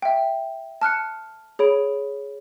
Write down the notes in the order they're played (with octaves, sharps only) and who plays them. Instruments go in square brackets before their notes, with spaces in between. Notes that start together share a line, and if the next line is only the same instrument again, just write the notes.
[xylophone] E5 G5
A5 F6 F#6 C#7
G#4 C#5 B5 D7